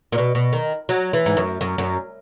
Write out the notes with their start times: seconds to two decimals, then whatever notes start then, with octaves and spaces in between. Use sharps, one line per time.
0.12 A#2
0.18 B2
0.35 B2
0.53 D#3
0.89 F#3
1.13 E3
1.26 G#2
1.37 F#2
1.61 F#2
1.78 F#2